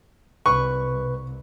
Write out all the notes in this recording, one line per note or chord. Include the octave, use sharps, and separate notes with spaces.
C2 B4 C#6